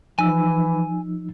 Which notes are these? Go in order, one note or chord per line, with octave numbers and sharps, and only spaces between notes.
E3 F3 D#4 G#5 E6